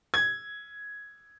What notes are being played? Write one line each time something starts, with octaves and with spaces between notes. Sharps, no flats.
G#6